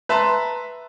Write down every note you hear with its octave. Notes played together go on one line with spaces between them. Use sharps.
B4 E5 A5 A#5 C6